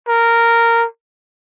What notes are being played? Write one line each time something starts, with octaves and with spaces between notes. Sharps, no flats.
A#4